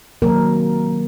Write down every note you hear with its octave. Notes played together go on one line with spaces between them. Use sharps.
C3 D#3 F#3 A#3 A#4